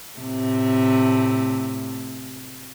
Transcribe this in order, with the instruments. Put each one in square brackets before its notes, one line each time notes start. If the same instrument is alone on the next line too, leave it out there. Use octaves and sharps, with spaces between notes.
[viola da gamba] A2 C3 A3